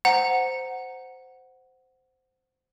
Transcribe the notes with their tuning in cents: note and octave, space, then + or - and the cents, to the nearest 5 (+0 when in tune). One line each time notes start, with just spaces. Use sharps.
C5 -10 F#5 +0 A#5 -5